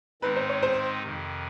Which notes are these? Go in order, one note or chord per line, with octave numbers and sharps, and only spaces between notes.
G#2 D#3 G#3 C4 D#4 B4
C5
C#5
C5
F2 C3 D#3